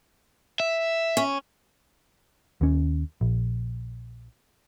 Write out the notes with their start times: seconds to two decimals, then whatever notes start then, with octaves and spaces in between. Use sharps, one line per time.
0.60 E5
1.17 C#4
2.61 D#2 C#4
3.21 A#1